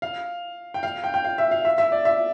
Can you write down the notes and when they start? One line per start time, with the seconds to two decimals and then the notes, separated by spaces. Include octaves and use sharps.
0.02 F5
0.74 G5
0.83 F5
1.04 G5
1.14 G5
1.25 F5
1.38 E5
1.51 F5
1.65 E5
1.78 E5
1.92 D5
2.05 E5